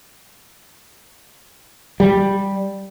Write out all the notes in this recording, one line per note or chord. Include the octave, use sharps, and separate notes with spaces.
G3